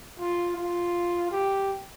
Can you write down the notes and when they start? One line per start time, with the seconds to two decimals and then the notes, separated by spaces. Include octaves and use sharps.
0.19 F4
0.56 F4
1.31 G4